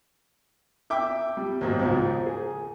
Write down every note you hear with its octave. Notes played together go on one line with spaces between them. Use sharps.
E5 G5 D6
G3
D#2 G#2 F#3
C#2 G#2 F3
G#4